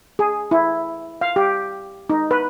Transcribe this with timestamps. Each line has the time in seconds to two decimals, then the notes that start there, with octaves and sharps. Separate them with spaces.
0.19 G#4
0.51 E4
1.21 F5
1.36 G4
2.10 D#4
2.31 B4